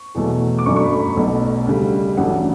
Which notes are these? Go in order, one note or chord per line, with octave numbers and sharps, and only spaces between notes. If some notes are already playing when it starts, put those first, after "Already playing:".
Already playing: C#6
E2 B2 F#3 A3
D6
G1 F#2 D3 F#3 A3 C#6
C#6
B5
B5
B1 B2 F#3 A3
D2 C#3 G3
A1 G2 F#3 A3 F#5